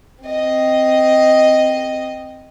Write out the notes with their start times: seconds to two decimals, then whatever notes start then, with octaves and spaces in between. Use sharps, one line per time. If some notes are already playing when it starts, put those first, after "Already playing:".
0.24 C4 D#5